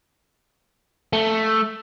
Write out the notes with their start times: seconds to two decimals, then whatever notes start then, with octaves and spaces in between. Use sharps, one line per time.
1.13 A3